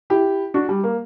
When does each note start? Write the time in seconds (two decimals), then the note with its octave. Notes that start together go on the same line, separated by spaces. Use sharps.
0.10 E4 G4
0.54 D4 F#4
0.69 G3
0.84 A#3